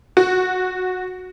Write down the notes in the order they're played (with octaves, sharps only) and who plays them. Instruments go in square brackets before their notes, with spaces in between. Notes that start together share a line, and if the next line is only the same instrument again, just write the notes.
[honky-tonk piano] F#4